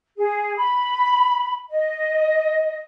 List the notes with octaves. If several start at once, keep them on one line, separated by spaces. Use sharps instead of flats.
G#4
B5
D#5